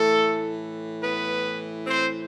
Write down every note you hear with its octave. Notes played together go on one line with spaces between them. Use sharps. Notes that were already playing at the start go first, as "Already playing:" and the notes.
Already playing: A2 E3 A3 A4
B3 B4
C4 C5